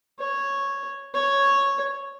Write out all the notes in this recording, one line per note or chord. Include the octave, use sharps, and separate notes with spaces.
C#5
C#5